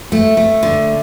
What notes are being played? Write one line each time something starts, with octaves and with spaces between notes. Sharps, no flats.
A3
A3
D3